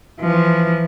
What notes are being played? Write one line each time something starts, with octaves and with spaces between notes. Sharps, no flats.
E3 F3